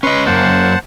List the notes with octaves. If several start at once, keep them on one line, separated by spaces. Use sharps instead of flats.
C#4 B4 D#5 C6 C#6
F#2 A#3 C5 F#5 A5